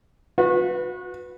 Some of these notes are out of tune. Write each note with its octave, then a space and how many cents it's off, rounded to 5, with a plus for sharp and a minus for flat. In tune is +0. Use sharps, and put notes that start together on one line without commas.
F#4 -30 B4 +0